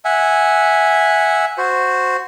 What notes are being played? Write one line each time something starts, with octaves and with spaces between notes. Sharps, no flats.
E5 F#5 G#5
F#4 C5